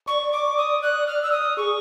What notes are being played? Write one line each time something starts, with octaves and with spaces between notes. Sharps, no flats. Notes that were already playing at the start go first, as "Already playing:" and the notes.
D5 C#6
D6
D#6
F#6
F6
E6
D#6
G#4 C#6